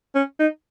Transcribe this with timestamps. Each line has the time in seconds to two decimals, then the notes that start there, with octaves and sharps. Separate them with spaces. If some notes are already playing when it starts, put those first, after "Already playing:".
0.15 C#4
0.40 D#4